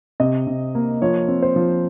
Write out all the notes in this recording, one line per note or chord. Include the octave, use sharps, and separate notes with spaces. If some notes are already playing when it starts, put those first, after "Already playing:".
C3 D#5
C3
A#3
F3 C#5
C4
C5
F3